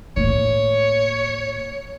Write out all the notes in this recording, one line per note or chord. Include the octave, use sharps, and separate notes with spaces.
A2 A#3 C#5